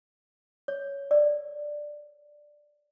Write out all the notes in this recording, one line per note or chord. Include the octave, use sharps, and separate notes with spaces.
C#5
D5